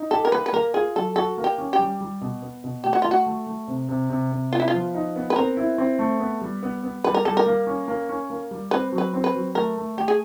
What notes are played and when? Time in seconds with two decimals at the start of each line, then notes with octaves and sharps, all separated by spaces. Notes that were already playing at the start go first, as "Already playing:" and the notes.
Already playing: D#4
0.11 G4 A4
0.25 A#4
0.32 A#3 B4
0.46 B4
0.53 A#3 A#4
0.74 F4 G#4
0.95 F#3 A4
1.16 F#4 A4
1.37 A#3
1.44 G4
1.58 C#4
1.73 G4
1.79 G3
2.01 G3
2.21 B2
2.42 B3
2.64 B2
2.84 A3 G4
2.93 F#4
3.02 A3 F4
3.11 F#4
3.26 A3
3.47 A3
3.68 C3
3.89 C3
4.10 C3
4.31 C3
4.52 B3 F4
4.60 E4
4.68 F4
4.74 F3
4.94 D#4
5.16 B3
5.30 B4
5.36 C4 A#4
5.57 E4
5.78 C4
5.99 A3
6.20 B3
6.41 G3
6.63 B3
6.84 B3
7.04 G3 B4
7.14 A#4
7.25 G3 A4
7.37 A#4
7.46 A#3
7.67 C#4
7.88 A#3
8.09 C#4
8.30 A#3
8.51 G3
8.71 C4 B4
8.92 F#3
8.98 B4
9.14 C4
9.24 B4
9.35 F#3
9.55 A3 A#4
9.77 A3
9.97 A3 G4
10.08 G#4